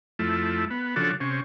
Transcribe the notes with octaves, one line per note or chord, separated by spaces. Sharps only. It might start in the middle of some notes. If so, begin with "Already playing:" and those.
F2 A3 E4
B3
C#3 F3 D4 F#4 A4
C3 C#4